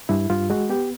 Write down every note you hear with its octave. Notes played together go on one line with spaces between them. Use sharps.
G2 E4
G2 F4
G#3 F#4
B3 G4